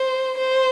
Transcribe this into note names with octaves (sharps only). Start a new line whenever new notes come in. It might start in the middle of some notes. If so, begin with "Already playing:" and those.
Already playing: C5
C5